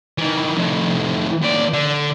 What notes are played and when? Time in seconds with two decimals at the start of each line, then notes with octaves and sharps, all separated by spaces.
0.18 D#3 E3
0.58 F2 A2
1.42 D#2 D5
1.73 D3